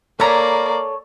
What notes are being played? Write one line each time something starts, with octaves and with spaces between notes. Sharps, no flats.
A#3 A4 C#5 D5 A#5 B5